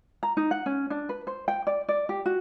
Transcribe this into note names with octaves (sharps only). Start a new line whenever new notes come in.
A#5
D#4
F#5
C#4
D4
B4
C5
G5
D5
D5
G4
F#4